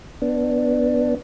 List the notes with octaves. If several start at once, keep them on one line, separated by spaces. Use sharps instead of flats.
B3 D4